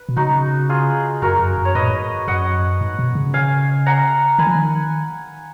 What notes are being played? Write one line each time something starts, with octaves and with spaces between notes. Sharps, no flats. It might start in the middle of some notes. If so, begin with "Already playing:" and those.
Already playing: B4
B2
C#3 D#4 F#4
F4 G#4
F#2 F#4 A#4
F#2
F#2
C#5
G#2 B4 D#5
A#2
G#2
F#2 D#5 F#5
G#2
B2
C#3
F5 G#5
F#5 A#5
D#3 G#5 B5
F3
D#3